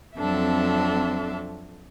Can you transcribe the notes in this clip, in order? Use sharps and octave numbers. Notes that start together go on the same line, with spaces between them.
F2 F#3 C4 D4 A4 E5